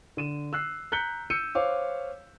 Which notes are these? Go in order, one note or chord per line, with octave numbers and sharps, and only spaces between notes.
D3 D#7 E7
E6 F#6 C7
A#5 F#6 G6 B6 C#7 G7
E6 G6 C#7 D#7
C5 C#5 F5 D6